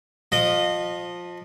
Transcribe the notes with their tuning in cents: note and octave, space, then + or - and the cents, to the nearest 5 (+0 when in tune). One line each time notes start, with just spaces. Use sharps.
F3 +15 D#5 -20